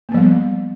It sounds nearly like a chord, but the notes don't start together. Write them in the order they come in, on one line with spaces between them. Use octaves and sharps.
A#3 B3 F3 G3